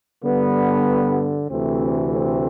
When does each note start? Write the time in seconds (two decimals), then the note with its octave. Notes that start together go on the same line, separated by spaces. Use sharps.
0.23 G2 D3 G3 B3
1.49 D2 C3 E3 A3 C4
2.12 A3 C4